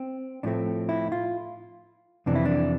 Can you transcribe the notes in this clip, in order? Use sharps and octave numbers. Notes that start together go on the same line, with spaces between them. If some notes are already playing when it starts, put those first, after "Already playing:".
Already playing: C4
A2 F3 A3 C4 D4
E4
F4
F2 C3 E3 D4
E4
D4